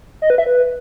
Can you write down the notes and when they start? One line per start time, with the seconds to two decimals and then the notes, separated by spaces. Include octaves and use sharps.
0.22 D#5
0.30 B4
0.38 E5
0.46 B4